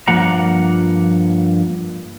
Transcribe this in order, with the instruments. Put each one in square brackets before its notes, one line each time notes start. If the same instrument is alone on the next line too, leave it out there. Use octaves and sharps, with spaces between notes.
[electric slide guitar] G2 F3 A#3 F#5 A#5